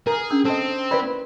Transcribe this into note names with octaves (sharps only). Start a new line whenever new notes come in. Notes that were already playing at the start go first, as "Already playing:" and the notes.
G#4 A#4
C#4 D4 E6
C4 A4 D#5 E6
A#4 B4 D5 F5 B5